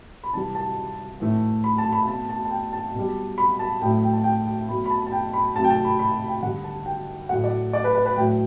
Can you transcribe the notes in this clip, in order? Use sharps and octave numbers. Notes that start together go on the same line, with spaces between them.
B5
C3 E3 G3 A5
A5
A2 E3 A3
B5
A5
B5
B2 A3 A5
A5
A5
G5
A5
B2 G3
B5
A5
A2 F#3 A3 G5
G5
A5
G5
B2 F#3 A3 B5
B5
A5
A5
G5
B5
C3 F#3 A3 A5
G5
A5
B5
B5
G5
D3 G3 F#5
A5
G5
A2 F#3 A3 F#5
D5
D5
B4
B4
B4
A2 F#3 A3 G5